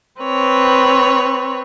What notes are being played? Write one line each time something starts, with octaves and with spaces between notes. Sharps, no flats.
C4 B4 C#5